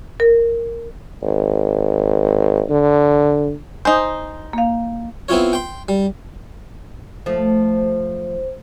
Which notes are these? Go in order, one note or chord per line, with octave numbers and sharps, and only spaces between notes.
A#4
G#1
D3
D#4 C5 G#5 D#6
A#3 F5
B3 C4 E4 F4 C#5
G5 C6
G3
F3 A3 C5